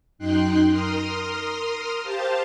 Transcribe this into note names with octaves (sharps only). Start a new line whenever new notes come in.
F#2 D#4 G5 C6 F#6
A#4 C6 D#6 F6
G4 C5 F5 A5